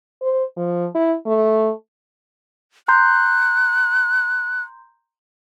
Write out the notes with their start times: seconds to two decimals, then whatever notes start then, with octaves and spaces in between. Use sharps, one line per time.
0.22 C5
0.57 F3
0.95 E4
1.26 A3
2.88 A#5 C6 F#6 G6